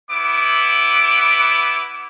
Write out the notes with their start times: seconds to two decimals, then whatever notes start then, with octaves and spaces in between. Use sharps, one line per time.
0.10 B3 E4 D6